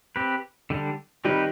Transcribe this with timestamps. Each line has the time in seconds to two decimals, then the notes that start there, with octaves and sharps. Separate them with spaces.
0.16 C4 G4 B4
0.70 D3 G3 D4
1.25 D#3 G3 C4 D#4 G4 B4